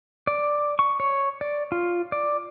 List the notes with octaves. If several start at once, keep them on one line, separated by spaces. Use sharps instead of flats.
D5
C#6
C#5
D5
F4
D5